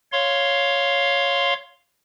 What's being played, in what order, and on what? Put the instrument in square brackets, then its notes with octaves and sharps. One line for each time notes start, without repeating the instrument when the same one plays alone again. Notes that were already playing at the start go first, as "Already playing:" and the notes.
[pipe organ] C#5 F5 C6